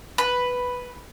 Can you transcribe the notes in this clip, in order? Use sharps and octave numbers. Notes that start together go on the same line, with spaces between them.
B4